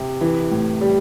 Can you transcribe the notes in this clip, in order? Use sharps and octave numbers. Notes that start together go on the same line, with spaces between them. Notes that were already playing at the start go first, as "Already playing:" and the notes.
Already playing: C3
E3
A2
G3